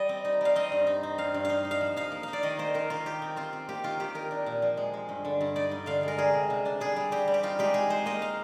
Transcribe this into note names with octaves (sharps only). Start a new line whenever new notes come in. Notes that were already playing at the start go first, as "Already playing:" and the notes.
Already playing: G3 D#5
C4
D#4
G3 F5
C4 D#5
G2
D#4
C4
G2 F5
G2
D#4 F5
D#4
F5
F3
D#4 F5
A#3
D#4 F5
D5
D#3 D#5
A#3 C5
D#3 A#4
D#3 F4
D#4 G4
C4
C4 F4
C4
A#3 G4
D#3 F4
D#3 G4
D#4 A#4
D4
A#2
F3
G#3
G#3
G2
D3
G2
D#4 D5
G2
D3 F5
G#3 A#4
G3 G#4
C3
C3
D4
G3 G#4
G3
C4 G4
G3
G4
D#4 F4
G#3 G4
D#4 G#4
G#3 C5
A#3 D#5
F5